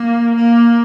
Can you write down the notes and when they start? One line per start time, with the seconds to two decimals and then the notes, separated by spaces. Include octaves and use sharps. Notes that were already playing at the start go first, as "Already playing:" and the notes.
Already playing: A#3
0.36 A#3